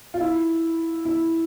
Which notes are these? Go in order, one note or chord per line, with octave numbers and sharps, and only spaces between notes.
F4
E4
E4